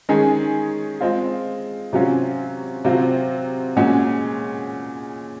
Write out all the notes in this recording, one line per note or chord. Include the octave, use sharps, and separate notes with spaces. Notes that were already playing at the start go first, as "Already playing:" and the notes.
D#3 G#3 C#4 G#4
G#3 C4 F4
C3 F#3 C#4 F4
C3 F#3 C4 F4
A#2 G#3 C#4 F#4